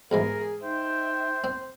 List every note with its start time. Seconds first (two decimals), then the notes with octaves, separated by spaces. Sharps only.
0.11 B1 G#2 E3 G#4 A#4
0.62 D#4 C5 E5 G5
1.44 C4